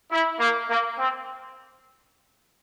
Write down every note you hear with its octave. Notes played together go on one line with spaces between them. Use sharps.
E4
A#3
A#3
C4